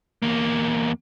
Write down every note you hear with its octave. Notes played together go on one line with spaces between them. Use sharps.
E2 A#3